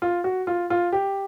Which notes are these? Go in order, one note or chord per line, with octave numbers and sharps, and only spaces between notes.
F4
F#4
F4
F4
G4